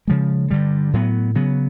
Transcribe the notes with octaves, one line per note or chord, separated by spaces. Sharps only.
C#3 F3 G#3
G2 D3 G3
A2 F#3 B3
C#3 F#3 B3